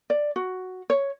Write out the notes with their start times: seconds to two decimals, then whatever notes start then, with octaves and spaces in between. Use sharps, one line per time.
0.10 D5
0.36 F#4
0.90 C#5